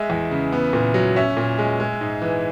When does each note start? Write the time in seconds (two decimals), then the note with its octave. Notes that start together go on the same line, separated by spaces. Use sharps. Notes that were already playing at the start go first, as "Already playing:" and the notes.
Already playing: G#3 E5
0.10 E2
0.31 C#3
0.52 B3
0.73 A#2
0.94 F#3
1.16 C#4 E5
1.37 A#2
1.58 G#3
1.80 G#3
2.01 G#2
2.22 E3